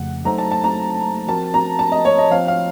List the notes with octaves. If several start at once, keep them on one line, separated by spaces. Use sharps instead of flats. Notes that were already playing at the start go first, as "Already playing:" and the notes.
Already playing: F2 C#3 F3 A3 F#5
F#3 A3 D#4 A4 C5 A#5
A5
A5
A#5
F3 C4 F#4 A#4 A5
A#5
A5
D#5
C#5
D#5
F3 C4 F4 C5 F5
F5